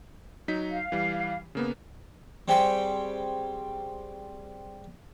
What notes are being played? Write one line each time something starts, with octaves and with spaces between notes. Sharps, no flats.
F#3 D#4 B6
F5
E3 G3
C#3 A#3 B3
G3 C4 G#4 G5 B5 C#6